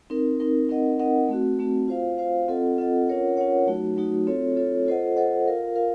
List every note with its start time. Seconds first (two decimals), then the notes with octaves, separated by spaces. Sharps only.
0.10 C4 D#4 A#4
0.40 C4 D#4 A#4
0.69 C4 D#4 A#4 D#5 F#5
0.99 C4 D#4 A#4 D#5 F#5
1.29 A3 C4 F#4
1.59 A3 C4 F#4
1.88 F4 C5 F5
2.18 F4 C5 F5
2.48 C4 F4 A4 D#5 F#5
2.78 C4 F4 A4 D#5 F#5
3.07 C#4 F4 A#4 C#5 F#5
3.37 C#4 F4 A#4 C#5 F#5
3.67 F#3 A3 D#4 F#4
3.97 F#3 A3 D#4 F#4
4.27 C4 F4 A4 C#5
4.56 C4 F4 A4 C#5
4.86 F4 A4 C5 D#5 F#5
5.17 F4 A4 C5 D#5 F#5
5.46 F4 A#4 F5
5.76 F4 A#4 F5